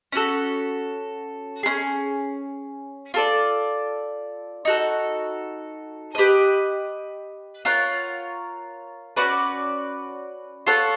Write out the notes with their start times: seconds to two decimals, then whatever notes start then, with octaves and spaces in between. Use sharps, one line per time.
0.12 C#4 F#4 A4
1.63 C#4 F4 G#4
3.14 F4 A4 D5
4.65 D#4 F#4 A4
6.15 G4 B4 D#5
7.65 F4 A#4 C#5 F#5
9.16 C#4 F#4 B4 D5
10.66 F4 A4 C#5 F#5